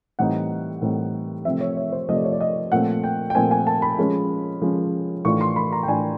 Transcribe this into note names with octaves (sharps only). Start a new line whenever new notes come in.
A2 E3 G3 C4 D#4 F#5
A2 E3 G3 C4 D#4
C3 F3 A3 C4 E5
C#5
C#5
C5
C3 F3 A3 C4 D#5
D5
C#5
D5
D#5
A#2 F3 A3 C4 F#5
G5
G5
A#2 F3 A3 C4 G#5
G#5
A5
B5
F3 G#3 C#4
F3 G#3 C#4
A2 E3 A3 D4 F4 C#6
C6
B5
A#5
G5
A2 E3 A3 D4 F4 G#5